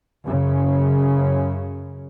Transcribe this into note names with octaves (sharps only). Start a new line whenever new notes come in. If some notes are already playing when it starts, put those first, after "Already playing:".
F#2 C#3